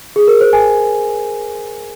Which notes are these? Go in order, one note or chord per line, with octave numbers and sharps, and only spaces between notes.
G#4
A#4
C5
G#5